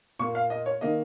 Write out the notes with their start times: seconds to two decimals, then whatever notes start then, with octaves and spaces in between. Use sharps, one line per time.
0.19 A#2 C#6
0.22 A#3
0.35 F5
0.50 D#5
0.66 C#5
0.81 D#3 A#3 D#5